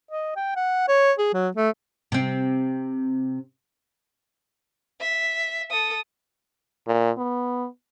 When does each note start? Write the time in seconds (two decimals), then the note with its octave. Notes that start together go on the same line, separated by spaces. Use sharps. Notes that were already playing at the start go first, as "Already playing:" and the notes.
0.11 D#5
0.36 G5
0.56 F#5
0.88 C#5
1.19 G#4
1.34 F#3
1.57 A3
2.12 C3 C4
5.01 E5
5.71 A4 D#6
6.87 A#2
7.17 B3